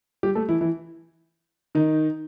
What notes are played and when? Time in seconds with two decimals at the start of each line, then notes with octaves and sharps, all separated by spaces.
0.23 G3 G4
0.35 A3 A4
0.49 E3 E4
0.61 E3 E4
1.75 D#3 D#4